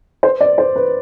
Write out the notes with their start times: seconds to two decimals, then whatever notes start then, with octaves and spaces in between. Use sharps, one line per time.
0.23 C5
0.41 D5
0.58 C5
0.76 B4